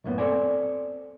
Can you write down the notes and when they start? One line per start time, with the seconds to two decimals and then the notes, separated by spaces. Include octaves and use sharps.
0.04 B1 F#2 A2 A#3 B3
0.18 C4 E4 A4 C5 D5 G#5